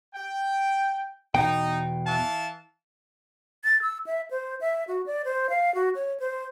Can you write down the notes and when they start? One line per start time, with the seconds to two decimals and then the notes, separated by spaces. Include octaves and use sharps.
0.15 G5
1.35 E2 B2 D#4 G5
2.06 E3 F5 A5
3.64 A6
3.82 E6
4.06 E5
4.31 C5
4.61 E5
4.88 F#4
5.06 D5
5.25 C5
5.50 F5
5.75 F#4
5.95 C#5
6.20 C5